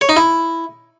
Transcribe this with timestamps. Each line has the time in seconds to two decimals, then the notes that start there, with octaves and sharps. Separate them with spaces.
0.01 C#5
0.09 D#4
0.16 E4